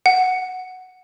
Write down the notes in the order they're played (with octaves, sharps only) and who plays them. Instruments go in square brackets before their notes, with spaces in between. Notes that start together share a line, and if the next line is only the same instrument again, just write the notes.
[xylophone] F#5